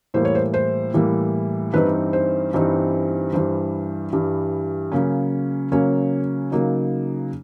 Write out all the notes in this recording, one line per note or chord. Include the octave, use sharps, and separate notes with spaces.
A2 E3 G3 A#3 C5
C#5
C5
C5
A2 E3 G3 A#3
G2 E3 G3 C4 D#4 B4
C5
G2 E3 G3 C4 D#4
G2 E3 G3 C5
G2 E3 G3
C#3 F#3 A#3 C#4
C#3 F#3 A#3 C#4 C#5
C#3 F#3 A#3 D#4